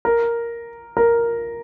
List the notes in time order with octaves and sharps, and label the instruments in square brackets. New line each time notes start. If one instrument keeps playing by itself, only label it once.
[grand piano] A#4
A#4